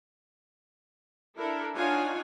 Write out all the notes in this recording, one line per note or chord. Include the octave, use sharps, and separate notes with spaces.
D4 E4 A4 A#4
D4 D#4 F4 C#5 F#5 G#5